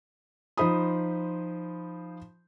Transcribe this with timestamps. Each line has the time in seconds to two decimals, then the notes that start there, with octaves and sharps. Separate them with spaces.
0.57 F3 D#4 C5 B5 D#6